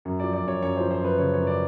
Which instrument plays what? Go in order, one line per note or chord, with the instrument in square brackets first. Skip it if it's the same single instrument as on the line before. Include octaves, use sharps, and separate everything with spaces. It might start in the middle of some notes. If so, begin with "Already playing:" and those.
[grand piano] F#2
F3 D5
D5
F#2
C#5
F#2 C#5
F3 C5
C5
F#2 B4
C#3 C#5
F#2 C#5
D5